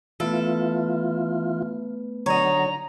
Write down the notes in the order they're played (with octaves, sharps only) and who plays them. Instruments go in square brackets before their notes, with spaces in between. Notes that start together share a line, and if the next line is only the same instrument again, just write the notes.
[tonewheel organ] E3 F4 [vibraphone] A3 B3 B4 [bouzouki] A4
[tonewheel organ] D3 F#3 [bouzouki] D#4 C#5 [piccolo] A#5